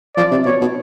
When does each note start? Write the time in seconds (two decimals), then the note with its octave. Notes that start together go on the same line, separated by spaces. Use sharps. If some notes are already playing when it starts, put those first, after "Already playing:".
0.16 F3 D5
0.31 C3
0.45 B2 C#5
0.61 B2